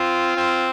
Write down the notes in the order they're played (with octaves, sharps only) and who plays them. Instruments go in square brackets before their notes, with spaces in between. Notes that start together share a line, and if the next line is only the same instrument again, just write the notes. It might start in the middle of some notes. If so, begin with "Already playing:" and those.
Already playing: [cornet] C4 [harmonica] F4
[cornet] C4